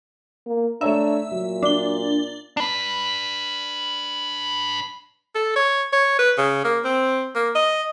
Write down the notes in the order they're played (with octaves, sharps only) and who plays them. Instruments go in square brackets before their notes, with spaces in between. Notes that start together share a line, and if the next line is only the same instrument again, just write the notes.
[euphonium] A#3
[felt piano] A3 C#5 A#5 [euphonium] D4 [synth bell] E5
[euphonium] A#2 [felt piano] F#3
[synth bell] D4 G7
[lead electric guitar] D4 B4
[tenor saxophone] A4
C#5
C#5
B4
C#3
A#3
C4
A#3
D#5